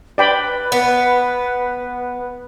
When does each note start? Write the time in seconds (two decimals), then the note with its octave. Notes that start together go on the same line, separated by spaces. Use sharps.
0.18 B4 D5 G5 B5
0.72 B3